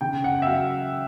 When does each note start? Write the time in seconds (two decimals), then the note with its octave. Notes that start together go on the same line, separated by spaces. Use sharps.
0.01 C#3 G5
0.24 F#5
0.42 E5
0.47 F#3 F5